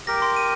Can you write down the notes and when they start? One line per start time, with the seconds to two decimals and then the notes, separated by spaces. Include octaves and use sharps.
0.07 G4 A#4 A#6
0.22 C6
0.36 D#7